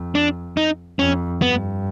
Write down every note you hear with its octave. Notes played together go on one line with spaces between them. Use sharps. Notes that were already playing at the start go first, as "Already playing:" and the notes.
Already playing: F2
D4
D#4
F2 C#4
G2 B3